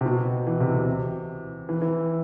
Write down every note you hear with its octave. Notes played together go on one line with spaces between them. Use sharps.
C3
B2
E3
C3
C3
E3
E3